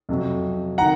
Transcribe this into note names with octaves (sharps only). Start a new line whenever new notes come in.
F2 C3 F#3
D#3 F#5 A#5